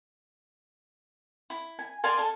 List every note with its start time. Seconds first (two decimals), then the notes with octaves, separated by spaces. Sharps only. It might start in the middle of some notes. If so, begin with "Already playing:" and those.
1.50 E4
1.79 G#5
2.03 D5 F5 G#5 C6
2.19 A4